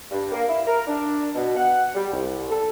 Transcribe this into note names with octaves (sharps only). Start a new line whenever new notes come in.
G2
A#3
E4
A#4
D4
B2
F#5
G3
C2
A4